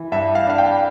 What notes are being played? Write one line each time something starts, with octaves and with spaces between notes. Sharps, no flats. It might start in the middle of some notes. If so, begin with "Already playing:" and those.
Already playing: E3
G2 E5
F5
D4 F5
G5